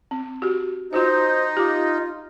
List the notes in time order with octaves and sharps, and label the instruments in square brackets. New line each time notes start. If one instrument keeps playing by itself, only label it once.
[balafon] C4
F#4 G4
[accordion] D#4 [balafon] F4 F#4 D#5 [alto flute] C5
[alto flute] F4 [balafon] G4 D6